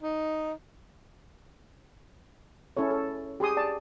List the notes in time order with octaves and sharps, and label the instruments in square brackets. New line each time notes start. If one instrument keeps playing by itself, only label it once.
[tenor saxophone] D#4
[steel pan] C#4 E4 A4 C#5
A4
G4 G#4 C6 D#6
D5 A5